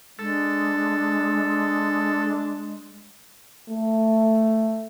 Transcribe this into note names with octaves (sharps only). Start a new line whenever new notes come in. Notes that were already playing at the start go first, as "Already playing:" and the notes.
G#3 D4 A4
A3